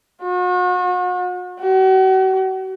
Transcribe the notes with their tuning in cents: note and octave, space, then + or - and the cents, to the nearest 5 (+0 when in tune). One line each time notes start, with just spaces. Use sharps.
F#4 -40
F#4 +40